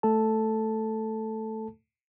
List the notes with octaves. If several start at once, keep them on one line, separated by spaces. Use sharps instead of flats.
A3 A4 A5